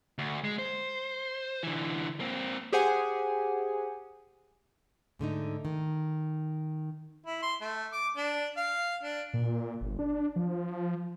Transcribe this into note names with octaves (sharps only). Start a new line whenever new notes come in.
D2
G#3
C5
D3 E3
A#3 C4
G4 G#4 C5 F#5 G#5
G#2 D3 A3 D#4
D#3
E4
C6
A3
D6
D4
F5
D4
A#2
G1
D4
F3